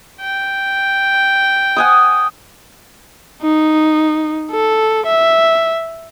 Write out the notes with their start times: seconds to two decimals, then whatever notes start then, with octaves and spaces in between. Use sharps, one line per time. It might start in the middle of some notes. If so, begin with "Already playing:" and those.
0.21 G5
1.76 F#5 G#5 D#6
3.43 D#4
4.51 A4
5.06 E5